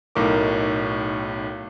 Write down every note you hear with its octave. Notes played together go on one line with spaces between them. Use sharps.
B1 A2 D#4 A#4 D6